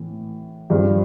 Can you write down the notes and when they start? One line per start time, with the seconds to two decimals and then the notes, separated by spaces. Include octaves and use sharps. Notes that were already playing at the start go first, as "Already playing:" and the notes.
Already playing: A2 E3
0.70 G2 F3